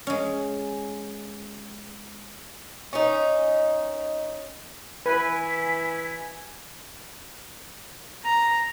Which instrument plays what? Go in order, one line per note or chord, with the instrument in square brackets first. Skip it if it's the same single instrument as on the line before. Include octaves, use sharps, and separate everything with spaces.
[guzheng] G#3 C#4
[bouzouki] C#4 D#4
[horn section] E3 E4 [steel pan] B4 [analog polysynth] G#5 [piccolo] B6
[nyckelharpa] A#5